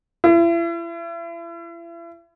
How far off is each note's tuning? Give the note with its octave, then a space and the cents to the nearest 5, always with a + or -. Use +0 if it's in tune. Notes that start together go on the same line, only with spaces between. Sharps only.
E4 +40